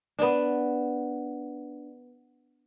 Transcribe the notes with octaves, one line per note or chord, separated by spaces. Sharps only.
B3 D4